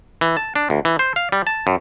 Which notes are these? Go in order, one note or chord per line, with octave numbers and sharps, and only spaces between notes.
E3
A5
D4
D2
E3
C5
F5
G3
A5
F#2